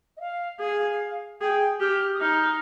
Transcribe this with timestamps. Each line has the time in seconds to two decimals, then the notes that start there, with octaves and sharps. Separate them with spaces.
0.17 D#5
0.20 F5
0.60 G#4 F5
1.41 G#4 G5
1.81 G4 F6
2.14 D#6
2.21 D#4 F6